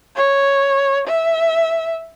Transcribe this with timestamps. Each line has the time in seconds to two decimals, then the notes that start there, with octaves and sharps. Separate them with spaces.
0.16 C#5
1.07 E5